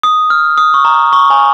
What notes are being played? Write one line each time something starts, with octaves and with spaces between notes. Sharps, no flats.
D#6
F6
D#6
C#6
A#5
C#6
G#5